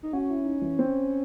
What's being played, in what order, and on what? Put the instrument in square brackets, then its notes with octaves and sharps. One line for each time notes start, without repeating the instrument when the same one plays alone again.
[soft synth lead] D#4
[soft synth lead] C#4 [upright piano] F#4
[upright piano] E4
D#4
E3
C4